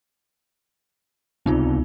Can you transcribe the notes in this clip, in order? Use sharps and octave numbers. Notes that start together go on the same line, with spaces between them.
C#2 C3 B3 C4 D#4 F4